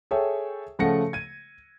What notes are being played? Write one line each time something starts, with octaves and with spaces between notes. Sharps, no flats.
G#4 A4 C#5 E5 G5
C#3 F3 A3 F#5 A#6 C#7
G#6 D#7